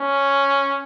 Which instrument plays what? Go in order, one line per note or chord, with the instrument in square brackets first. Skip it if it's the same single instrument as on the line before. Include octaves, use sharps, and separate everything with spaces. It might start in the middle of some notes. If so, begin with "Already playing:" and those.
Already playing: [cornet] C#4